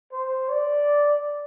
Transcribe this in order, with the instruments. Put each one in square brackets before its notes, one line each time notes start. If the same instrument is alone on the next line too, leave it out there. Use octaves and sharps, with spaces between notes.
[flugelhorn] C5
D5